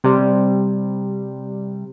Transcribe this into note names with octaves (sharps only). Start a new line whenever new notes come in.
C3 G3